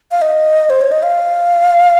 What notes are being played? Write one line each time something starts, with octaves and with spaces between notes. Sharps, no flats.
F5
D#5
C5
C#5
D#5
F5